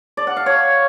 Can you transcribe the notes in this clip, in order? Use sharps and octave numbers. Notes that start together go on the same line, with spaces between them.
D5
F#5
F5
C#5